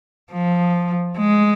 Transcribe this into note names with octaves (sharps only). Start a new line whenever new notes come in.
F3
G#3